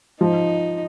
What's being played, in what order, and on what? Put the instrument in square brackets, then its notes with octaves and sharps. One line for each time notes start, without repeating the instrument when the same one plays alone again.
[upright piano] F3 [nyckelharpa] D#4